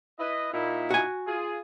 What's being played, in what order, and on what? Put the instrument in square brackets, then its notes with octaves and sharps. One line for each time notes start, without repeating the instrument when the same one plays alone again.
[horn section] E4 B4 D#5
A#2 D#4 E4
[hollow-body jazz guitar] F#4 G#5
[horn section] F4 G#4